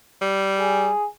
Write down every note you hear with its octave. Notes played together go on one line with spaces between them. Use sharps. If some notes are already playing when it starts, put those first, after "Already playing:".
G3
G#4